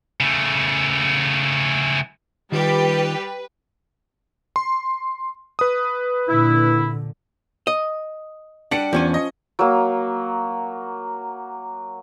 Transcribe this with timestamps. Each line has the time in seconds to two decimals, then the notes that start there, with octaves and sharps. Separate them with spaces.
0.20 C#3 A3
2.52 D#3 G3 F4 G4 B4
4.56 C6
5.59 B4 D#6
6.28 A#2 D3 E4
7.67 D#5
8.71 G3 D4 G4 F#5 C#7
8.93 E2 F3 C#4 G#5
9.14 D#5
9.59 F#3 A#3